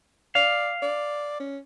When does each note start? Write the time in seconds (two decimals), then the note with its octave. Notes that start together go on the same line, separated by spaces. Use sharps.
0.35 D5 F5
0.83 D5
1.40 C#4